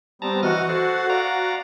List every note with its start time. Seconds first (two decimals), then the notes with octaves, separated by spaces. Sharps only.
0.22 G3 B3 C4 A5 A#5
0.43 E3 F#4 D#5 F#5 F6
0.69 A4 C5
1.10 D5 F5 A#5